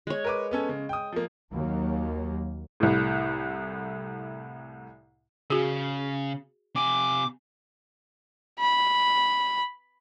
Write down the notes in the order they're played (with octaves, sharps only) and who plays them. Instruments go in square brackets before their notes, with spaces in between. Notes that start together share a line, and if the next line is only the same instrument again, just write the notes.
[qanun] G#3 C#5
[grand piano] A#4 B4 D6
B3 C#4 A4
C#3
G5 D#6
F3 A#3
[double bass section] D#2 F#3 A#3
[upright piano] C2 A2
[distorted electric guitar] C#3 [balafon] F#4 G#4
[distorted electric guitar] C3 G#5 [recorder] D6
[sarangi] B5